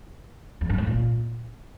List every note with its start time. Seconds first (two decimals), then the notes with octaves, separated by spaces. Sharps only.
0.61 F2
0.70 G2
0.78 G#2
0.87 A#2